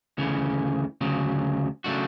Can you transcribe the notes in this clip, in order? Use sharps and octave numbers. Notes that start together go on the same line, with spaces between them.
D2 C#3 E3
D2 C#3 F#3
C#3 F#3 A3 D4 F#4